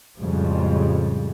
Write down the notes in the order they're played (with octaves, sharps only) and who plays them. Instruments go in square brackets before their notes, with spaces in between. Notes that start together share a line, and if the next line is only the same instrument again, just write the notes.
[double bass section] F2 A2 C#3 F3 G3 G#3